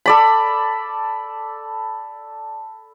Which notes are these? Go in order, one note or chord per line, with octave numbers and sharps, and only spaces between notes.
A4 D5 B5